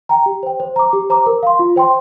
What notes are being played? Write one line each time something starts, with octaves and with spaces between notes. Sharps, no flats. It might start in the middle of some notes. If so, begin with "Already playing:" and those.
G5 A#5
G4
C5 G5
C5
A#5 D6
G4
C5 A#5 D6
A#4
F5 C6
F4
C5 G5 C6